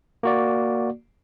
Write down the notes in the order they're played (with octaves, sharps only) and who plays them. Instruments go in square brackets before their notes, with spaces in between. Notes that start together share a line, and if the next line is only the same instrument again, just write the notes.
[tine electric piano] A#3 F#4 D5